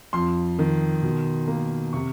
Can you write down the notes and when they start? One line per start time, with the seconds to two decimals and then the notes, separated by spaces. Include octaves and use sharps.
0.13 F2 C6
0.59 D#3
1.03 B2
1.48 A#3
1.93 C3 C#6